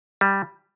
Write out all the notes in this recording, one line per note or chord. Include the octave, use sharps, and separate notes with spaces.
G3